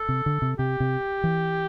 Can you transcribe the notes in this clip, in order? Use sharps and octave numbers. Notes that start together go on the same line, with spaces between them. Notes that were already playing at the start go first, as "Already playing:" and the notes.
Already playing: A4
C3
D3
C3
C3 G4
C3
E3